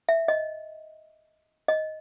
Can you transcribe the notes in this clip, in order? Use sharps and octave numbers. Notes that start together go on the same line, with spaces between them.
E5
D#5
D#5